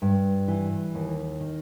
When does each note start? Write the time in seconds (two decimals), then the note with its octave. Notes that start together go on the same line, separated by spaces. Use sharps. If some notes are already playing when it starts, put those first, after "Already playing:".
0.02 G2
0.48 E3
0.94 D#2
1.40 D#3